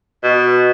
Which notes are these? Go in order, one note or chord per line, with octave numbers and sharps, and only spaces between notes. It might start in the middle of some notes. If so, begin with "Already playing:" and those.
B2